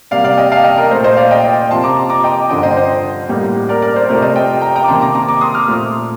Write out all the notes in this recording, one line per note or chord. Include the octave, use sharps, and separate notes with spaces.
C3 G3 A#3 D5 F5
D5 F5
D#5 G5
F5 A5
D#5 G5
A#4
A#2 A3 C5
C5 D#5
D5 F5
D#5 G5
D#5 G5
C3 F3 A#3 A5 C6
A#5 D6
A#5 D6
D#5 G5
G2 D3 F3 D#5 G5
C5 D#5
C5
A2 G3 A#3
A#4 D5
A#4 D5
C5
C3 F3 A3 A#4 D5
C5 D#5
D#5 G5
G5 A#5
G5 A#5
D6
C3 D#3 A#3 A5 C6
A#5 D6
A#5 D6
A#5 D6
C6 D#6
D6 F6
A#2 F3 A3